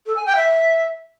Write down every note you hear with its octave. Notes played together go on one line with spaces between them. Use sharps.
A4
G#5
G5
E5